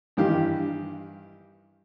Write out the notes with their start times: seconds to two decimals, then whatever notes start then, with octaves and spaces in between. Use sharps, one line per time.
0.17 G2 D#3 E3 G4 F5